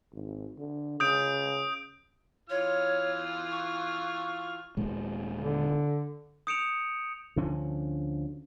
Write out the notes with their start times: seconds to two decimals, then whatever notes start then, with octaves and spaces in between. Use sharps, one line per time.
0.13 G#1
0.58 D3
1.00 C#3 D#6 G6 D7
2.49 E3 F4 C#5 F6
3.50 C#6
4.77 D#1 A#2 G#3
5.40 D3
6.47 D#6 G6 C#7 D7 E7 F7
7.36 D2 D3 F3 C#4